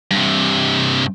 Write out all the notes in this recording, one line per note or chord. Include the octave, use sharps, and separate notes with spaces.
G2 C3